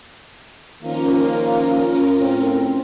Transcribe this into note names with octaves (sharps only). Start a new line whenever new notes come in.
D#3 F3 A#3 C#4 F4 A#4
A2 C4